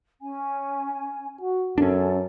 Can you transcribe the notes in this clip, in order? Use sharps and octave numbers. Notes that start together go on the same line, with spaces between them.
C#4 G#5
F#4
F#2 C#4 D4 A4